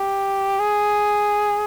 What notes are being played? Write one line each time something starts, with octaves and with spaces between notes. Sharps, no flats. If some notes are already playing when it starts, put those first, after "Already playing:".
Already playing: G4
G#4